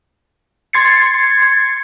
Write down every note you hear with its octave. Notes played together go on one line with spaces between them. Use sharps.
C6 G#6 A6 C7 C#7